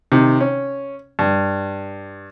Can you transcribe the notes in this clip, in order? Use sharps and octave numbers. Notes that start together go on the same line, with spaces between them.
C3 D#3
C#4
G2